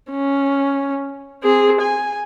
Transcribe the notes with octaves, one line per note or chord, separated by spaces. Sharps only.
C#4
C4 G#4
G#5